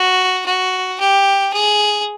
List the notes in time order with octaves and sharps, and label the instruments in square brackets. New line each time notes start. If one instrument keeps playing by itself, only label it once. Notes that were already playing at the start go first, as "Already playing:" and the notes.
Already playing: [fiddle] F#4
F#4
G4
G#4